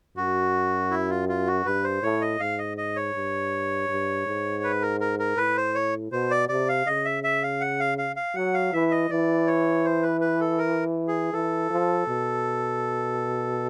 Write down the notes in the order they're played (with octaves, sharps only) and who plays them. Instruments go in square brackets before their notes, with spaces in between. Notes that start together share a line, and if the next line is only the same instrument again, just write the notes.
[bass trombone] F#2 [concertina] F#4
[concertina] E4
F4
F4
F#4
[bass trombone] G2 [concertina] B4
[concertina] C5
[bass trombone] A2 [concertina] C#5
[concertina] D#5
[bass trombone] G#2 [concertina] F5
[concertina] D#5
D#5
C#5
[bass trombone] G2
G2
G#2
[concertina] B4
A#4
A#4
A#4
[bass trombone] A2 [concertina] B4
[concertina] C5
C#5
[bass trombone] B2 [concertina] C5
[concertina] D5
[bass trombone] C3 [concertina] D5
[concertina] F5
[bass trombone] C#3 [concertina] D#5
[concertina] E5
E5
F5
F#5
F5
F5
F5
[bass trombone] F#3 [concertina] F#5
[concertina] F5
[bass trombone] E3 [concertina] E5
[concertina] D#5
[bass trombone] E3 [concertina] D5
[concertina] C#5
C5
B4
B4
A4
A#4
G#4
[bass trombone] E3 [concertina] A4
[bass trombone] F3
B2